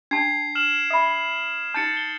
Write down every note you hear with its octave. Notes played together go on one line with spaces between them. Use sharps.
D4 A5 G#6 C7
F6 E7 F#7
E5 B5 D#6
D#4 A5 G6 A6 C#7
G7